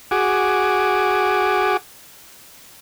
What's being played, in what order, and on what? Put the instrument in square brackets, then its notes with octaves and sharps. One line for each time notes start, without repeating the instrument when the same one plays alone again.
[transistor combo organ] F#4 G#4 D6